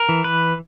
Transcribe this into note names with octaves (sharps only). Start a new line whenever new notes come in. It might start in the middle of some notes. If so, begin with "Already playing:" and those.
Already playing: A#4
E3
B4